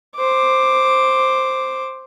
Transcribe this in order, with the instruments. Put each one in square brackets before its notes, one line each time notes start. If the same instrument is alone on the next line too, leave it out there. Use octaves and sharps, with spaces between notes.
[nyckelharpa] C5 D6